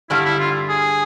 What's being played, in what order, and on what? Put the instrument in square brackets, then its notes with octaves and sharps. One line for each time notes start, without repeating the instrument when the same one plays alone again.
[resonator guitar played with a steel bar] G2 D3 G3 [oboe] E4
[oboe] E4
F4
G#4